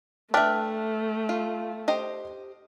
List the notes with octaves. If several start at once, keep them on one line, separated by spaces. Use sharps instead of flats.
A3 D4 B4 E5 G5 F6
F4
G4 C5 D#5